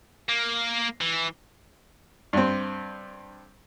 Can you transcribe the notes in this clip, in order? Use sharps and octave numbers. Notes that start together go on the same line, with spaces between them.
A#3
E3
G2 C4